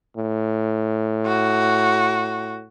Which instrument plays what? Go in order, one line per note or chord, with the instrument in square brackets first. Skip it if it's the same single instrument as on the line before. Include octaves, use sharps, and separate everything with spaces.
[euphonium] A2
[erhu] F#4